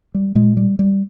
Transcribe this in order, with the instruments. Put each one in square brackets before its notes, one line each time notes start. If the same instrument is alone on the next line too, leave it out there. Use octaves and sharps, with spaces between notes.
[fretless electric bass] G3
A#2 G#3
G3
G3